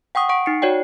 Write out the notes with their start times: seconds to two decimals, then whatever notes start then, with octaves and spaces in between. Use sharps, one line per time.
0.15 F#5 G5 C#6 D#6
0.29 F#5 C#6 D7
0.46 D#4 C7 C#7
0.62 F#4 C#5 D5 G5